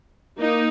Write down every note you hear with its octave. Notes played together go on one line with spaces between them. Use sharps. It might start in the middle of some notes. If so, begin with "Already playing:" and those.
A#3 D#4